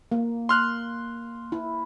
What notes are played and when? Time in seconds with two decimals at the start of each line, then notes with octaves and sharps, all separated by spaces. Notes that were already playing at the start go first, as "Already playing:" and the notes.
0.12 A#3
0.49 C6 F6 F#6
1.52 E4